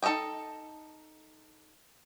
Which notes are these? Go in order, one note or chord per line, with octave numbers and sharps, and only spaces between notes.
D#4 A4 A#4 D#5 G5